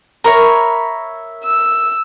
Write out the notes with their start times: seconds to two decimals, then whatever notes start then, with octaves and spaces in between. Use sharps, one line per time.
0.24 A#4 C#5 E5 A#5 B5 C#6
1.44 E6